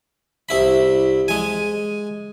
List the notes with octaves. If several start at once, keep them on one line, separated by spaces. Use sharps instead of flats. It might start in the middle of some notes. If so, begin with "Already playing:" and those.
C2 E4 B5
G#3 G#5